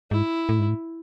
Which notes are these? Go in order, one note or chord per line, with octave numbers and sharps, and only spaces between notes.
G#2 E4
A2
G#2
A2